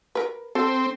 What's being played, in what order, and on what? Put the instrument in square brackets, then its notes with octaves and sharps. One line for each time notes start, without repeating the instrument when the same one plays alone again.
[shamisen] A#4 B4
[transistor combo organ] C4 [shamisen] A4